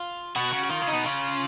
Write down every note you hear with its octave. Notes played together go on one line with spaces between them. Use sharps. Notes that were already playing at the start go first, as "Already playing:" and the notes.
Already playing: F4
B2 F#4
C#3
F#4
D#3 F4
C#3
D#4
B2
C#3 F4